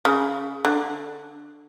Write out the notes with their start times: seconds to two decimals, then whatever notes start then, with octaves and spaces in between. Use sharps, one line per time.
0.05 C#3
0.65 D3